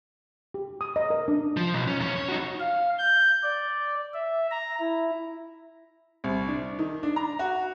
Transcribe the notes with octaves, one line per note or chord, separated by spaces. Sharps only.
G4
D#6
D#5
A#4
D4
F3
B1
C#4
E2 C#4
C#5
D#4 F#4
F5
G6
D5
E5
A#5
E4
C2
D4
D#3
D4
A#5
F#4